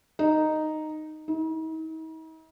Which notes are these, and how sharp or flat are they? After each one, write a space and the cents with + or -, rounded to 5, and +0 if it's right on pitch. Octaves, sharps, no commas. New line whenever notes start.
D#4 -5
D#4 +45